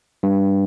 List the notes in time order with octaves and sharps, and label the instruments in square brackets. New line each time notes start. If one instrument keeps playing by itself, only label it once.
[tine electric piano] G2